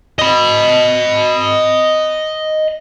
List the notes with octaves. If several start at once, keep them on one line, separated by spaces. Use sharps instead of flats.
D#5 B5